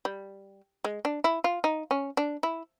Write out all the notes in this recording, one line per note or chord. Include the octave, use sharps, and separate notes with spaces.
G3
G#3
D4
E4
F4
D#4
C#4
D4
E4